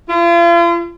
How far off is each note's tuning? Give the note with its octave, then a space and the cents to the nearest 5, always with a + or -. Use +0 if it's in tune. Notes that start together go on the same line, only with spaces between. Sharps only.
F4 -40